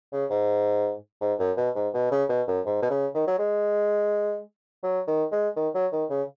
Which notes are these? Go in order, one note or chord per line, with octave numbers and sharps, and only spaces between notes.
C#3
G#2
G#2
F#2
B2
G#2
B2
C#3
B2
F#2
G#2
B2
C#3
D#3
F#3
G#3
F#3
D#3
G#3
D#3
F#3
D#3
C#3